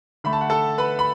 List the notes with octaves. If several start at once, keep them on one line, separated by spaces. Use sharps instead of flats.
D3 A3 B5
A5
F#5
A4 A5
B4 B5
B5